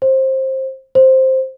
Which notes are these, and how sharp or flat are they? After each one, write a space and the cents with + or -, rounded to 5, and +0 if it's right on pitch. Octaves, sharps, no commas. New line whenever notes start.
C5 +20
C5 +5